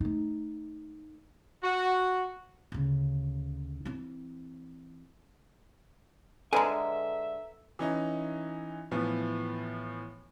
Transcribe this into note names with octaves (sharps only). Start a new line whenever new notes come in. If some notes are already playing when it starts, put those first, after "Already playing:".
A3 D#4
F#4
D2 C#3
E3 C4
D3 G#3 A4 B4 E5 G#5 A#5
E3 C#4 D#4
A2 E3 F3 B3